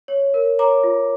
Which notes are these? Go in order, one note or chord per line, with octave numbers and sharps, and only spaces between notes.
C#5
A#4
C#5 A#5 D6
F4